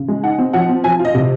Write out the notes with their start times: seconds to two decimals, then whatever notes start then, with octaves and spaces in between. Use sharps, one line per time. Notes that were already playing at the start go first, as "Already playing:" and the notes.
Already playing: C#3
0.08 G#3
0.23 D#4 F#5
0.39 C4
0.53 F3 F#5
0.69 C4
0.84 F3 G#5
0.99 F4
1.05 D#5
1.14 C3